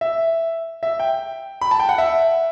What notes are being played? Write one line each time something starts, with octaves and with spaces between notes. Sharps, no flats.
E5
E5
G5
B5
A5
G5
F#5
E5